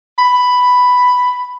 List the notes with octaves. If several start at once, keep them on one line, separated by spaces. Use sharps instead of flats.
B5